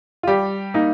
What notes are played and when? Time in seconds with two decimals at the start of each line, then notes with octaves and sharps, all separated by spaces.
0.23 F4
0.27 G3 G4
0.74 A#3 D#4